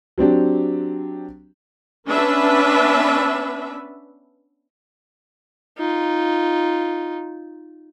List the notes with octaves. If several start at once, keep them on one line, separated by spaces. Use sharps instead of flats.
F#3 C4 D4 G4
B3 C#4 D4 B4 E5
D#4 F4